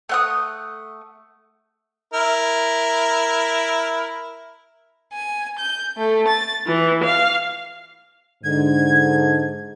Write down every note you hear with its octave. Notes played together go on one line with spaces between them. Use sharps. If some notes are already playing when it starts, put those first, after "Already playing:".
A3 F#5 D#6
E4 A#4
G#5
G6
A3
A6
E3
F5
G#2 D3 G#6